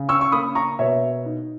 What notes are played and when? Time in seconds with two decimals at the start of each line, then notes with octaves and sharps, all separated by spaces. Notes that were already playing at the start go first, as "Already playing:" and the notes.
Already playing: C#3
0.09 C#6 E6
0.21 C#6
0.32 A#3 B5 D#6
0.55 A#5 C#6
0.79 B2 C#5 E5
1.26 D#4